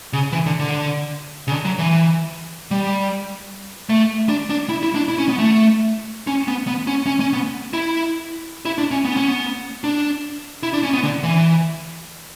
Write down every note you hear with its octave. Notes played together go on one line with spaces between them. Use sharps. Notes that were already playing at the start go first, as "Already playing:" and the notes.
C#3
E3
D3
D3
C#3
D3
F#3
E3
G3
A3
D4
D4
E4
E4
D4
E4
C#4
B3
A3
C#4
B3
B3
C#4
C#4
C#4
B3
E4
E4
D4
C#4
B3
C#4
B3
D4
E4
D4
C#4
B3
D3
E3